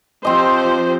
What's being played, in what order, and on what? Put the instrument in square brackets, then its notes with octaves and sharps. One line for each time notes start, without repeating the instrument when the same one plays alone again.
[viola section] F3 G4 C5 [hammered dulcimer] C4 D#5